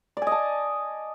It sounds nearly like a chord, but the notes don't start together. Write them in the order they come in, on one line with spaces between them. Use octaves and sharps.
D5 G#5 D#5 A5